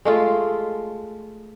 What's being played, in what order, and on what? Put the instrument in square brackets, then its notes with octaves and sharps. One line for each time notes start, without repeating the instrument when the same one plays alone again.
[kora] G#3 A3 F4